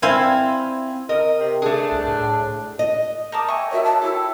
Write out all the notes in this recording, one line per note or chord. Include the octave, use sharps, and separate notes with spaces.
C4 E4 F5 G#5
A#4 D#5
C3
A3 D4 G#4
C2
A2
D#5
A#4 A5 D6 D#6 G6
D#5 E5 G5 G#5 C#6
F#4 A#4 C#5 E5
A5
E4 G4 A4